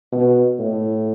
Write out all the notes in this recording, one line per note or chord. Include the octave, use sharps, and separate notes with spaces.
B2
A2